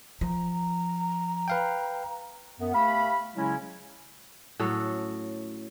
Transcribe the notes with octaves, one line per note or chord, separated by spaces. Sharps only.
F3 A#5
B4 F5 G5
F#2 B3
A3 G4 F5 B5
C#3 F#3 G#3 C#4 E4
A2 F#3 C#4 A4